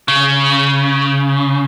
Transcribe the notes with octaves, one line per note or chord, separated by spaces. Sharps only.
C#3